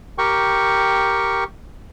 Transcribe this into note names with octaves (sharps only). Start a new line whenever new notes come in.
G4 A#4 G5 C#6